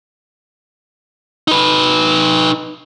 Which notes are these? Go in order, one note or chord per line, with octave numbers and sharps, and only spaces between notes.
D#4 B4